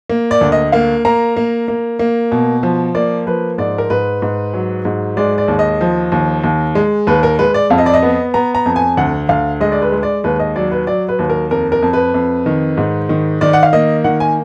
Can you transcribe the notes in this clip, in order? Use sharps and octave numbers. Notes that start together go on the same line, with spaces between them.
A#3
D5
D2
D#5
A#3 F5
A#3 A#5
A#3
A#3
A#3
B2
F3
A#3 D5
F3 B4
G#2 D5
A#4
G#2 B4
G#2
F#3
G#2
G#3 D5
D5
D#2
D#5
F3
D#2
D#2
G#3
D#2 B4
A#4
G#3 B4
D5
F2 F5
D#5
D5
D#5
B3
B3 A#5
A#5
F2
G#5
D2 F#5
D2 F5
G#3 D#5
D5
B4
G#3
D5
D#2 B4
D#5
F#3 D5
B4
F#3 D5
B4
D#2
A#4
F2 A#4
A#4
F2
B4
F2
D#3
G#2
D#3
D#3 D5
F#5
F5
A#3 D#5
D#3 F#5
G#5